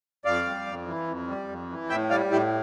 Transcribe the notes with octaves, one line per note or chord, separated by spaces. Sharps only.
F2 D5 F5
G3
F2
E3
F2
G3
F2
E3
A2 E5 G5
G3 D5 F5
A2 E4 G4